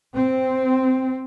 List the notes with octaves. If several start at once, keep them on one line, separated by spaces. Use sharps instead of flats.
C4